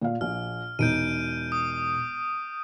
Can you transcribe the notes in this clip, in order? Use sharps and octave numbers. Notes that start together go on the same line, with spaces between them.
A#2 F5
A#1 F6
E1 D#4 G6 D7 D#7
D#6